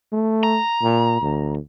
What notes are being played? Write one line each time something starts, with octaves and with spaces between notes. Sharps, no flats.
A3
A#5
A#2
D2